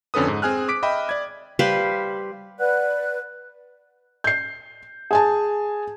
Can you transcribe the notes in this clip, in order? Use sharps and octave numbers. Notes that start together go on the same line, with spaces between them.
F2 D3 C#4 A4 B4 D#6
G#2
C4 G#4 G#5 F6 F#6
D6 B6 D7
D#5 E5 G5 B5
D5 G#6
G3 B4 C5 F5
B4 D5 F#5 F#6
G6 C7
G#4 G#5 A5